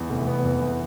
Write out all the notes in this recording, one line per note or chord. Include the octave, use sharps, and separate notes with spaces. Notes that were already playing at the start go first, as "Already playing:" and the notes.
Already playing: E2
F1
B3
E2
E2